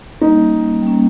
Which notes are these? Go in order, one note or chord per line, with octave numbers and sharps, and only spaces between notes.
G3 A#3 C#4 D#4
G3 A#3 C#4